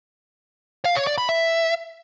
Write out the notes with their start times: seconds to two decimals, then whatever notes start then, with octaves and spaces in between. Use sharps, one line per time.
0.85 F5
0.96 C#5
1.07 D5
1.18 B5
1.29 E5